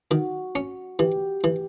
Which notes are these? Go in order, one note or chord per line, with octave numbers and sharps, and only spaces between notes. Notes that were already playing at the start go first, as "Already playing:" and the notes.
D#3 F#4
C#4
E3 G4
E3